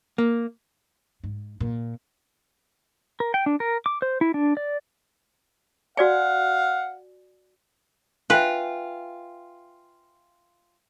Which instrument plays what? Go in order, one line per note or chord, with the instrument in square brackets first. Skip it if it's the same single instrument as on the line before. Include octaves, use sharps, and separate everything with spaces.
[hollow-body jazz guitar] A#3
[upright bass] G#2
A#2
[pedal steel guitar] A#4
G5
D4
A#4
D6
C5
E4
D4
D5
[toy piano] F#4 D5 G#5 [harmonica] F5 F#5
[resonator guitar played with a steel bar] F4 [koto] B4 [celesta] E5 G5 G#5